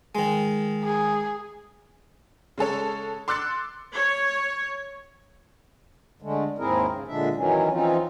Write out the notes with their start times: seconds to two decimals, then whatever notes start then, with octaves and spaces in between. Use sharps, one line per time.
0.15 D#3 G#3
0.84 G#4
2.58 C#3 G#3 A4 C#5
3.28 C6 D6 E6 F#6 A6 C#7
3.94 C#5
6.22 D3 G#3 A3
6.58 D#2 G#2 C4 E4 G#4 A#4
6.89 C#3
7.08 A#2 D3 G#3 D4 E5
7.36 D#3 E3 F#3 C#4
7.72 E3 F3 C4 C#4 D#4 F4